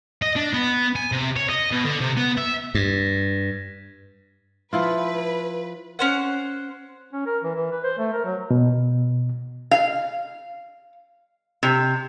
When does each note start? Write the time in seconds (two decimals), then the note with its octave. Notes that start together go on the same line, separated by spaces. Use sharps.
0.22 D#5
0.36 D4
0.54 B3
0.96 G#5
1.12 C3
1.36 C#5
1.49 D#5
1.71 B2
1.84 D3
2.01 C3
2.17 B3
2.37 E5
2.75 G2
4.73 F3 E4 F4 B4
5.99 C#4 C5 F#5
7.13 C#4
7.26 A#4
7.44 E3
7.55 E3
7.72 B4
7.84 C5
7.98 A3
8.13 A#4
8.24 F#3
8.51 B2
9.71 F5
11.63 C3